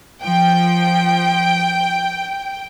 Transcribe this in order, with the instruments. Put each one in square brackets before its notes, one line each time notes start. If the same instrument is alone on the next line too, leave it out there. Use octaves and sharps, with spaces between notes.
[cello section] F3 [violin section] G5